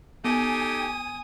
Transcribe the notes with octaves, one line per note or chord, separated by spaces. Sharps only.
B3 D#4 G4 A4 G#5 D#6